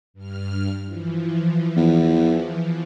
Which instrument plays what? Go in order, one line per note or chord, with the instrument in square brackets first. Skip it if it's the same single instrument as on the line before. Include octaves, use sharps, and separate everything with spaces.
[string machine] G2 F6
E3 F3
[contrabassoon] E2